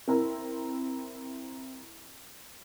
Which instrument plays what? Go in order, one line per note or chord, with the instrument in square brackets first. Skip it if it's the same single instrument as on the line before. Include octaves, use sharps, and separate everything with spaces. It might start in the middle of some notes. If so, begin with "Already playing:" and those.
[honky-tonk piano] C4 E4 A#4